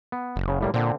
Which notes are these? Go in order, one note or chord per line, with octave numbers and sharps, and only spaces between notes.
B3
F#1
C#3
A2 G3 A#3
A#2 D3 C4